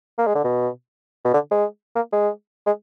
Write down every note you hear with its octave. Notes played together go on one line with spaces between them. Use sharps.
A#3
G#3
D3
B2
B2
D3
G#3
A#3
G#3
G#3